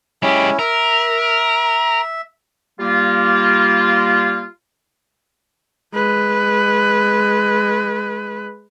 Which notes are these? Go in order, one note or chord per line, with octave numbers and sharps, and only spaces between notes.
G#3 C#4 E4 G4
A#4 E5
G3 A#3 F4
G#3 B4